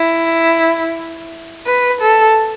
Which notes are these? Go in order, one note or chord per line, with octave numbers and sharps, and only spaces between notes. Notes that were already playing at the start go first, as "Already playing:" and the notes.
Already playing: E4
B4
A4